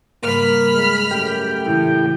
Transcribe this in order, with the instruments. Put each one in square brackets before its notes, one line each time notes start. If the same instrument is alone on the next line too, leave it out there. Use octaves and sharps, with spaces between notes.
[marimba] G#2 C#3 G3 [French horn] A#3 [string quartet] B5 F6
[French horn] G#3
[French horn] F#2 [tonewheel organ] A3 G4 G5
[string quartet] A2 [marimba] C#3 E3 E4